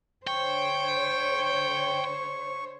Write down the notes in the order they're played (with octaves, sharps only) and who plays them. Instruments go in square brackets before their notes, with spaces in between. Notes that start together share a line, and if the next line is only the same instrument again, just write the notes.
[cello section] D3 C5 C#5 [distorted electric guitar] G5 [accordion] C#6